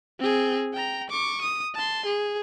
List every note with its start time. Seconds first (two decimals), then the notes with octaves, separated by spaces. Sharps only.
0.19 C4 G#4
0.73 G5 A#5
1.10 C#6 D6
1.41 D#6
1.75 A5 C6
2.06 G#4